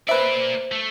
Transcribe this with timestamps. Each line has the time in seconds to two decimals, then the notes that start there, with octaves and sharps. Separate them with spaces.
0.09 A#3 B4 C5 D5 E5
0.72 A3